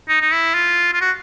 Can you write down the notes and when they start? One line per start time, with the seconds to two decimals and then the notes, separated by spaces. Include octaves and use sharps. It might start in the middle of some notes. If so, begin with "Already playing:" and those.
0.09 D#4
0.21 D#4
0.33 E4
0.55 F4
0.93 F4
1.01 F#4